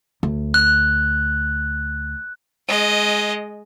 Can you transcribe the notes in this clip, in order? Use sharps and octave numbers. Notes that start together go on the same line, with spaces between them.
D2
F#6
G#3 D#5